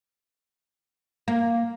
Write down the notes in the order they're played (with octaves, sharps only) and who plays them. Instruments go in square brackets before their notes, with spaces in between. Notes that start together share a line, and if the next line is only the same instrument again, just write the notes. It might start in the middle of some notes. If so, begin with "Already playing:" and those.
[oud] A#3